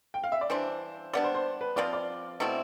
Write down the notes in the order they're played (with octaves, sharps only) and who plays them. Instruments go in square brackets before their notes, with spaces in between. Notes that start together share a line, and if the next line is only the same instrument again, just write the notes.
[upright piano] G5
F5
E5
D5
[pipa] E3 G3 D4 [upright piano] C5
[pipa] G3 B3 D4 [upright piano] D5
[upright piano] C5
C5
B4
[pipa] F3 C4 F4 [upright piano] D5
[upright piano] D5
[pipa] B2 A3 C4 E4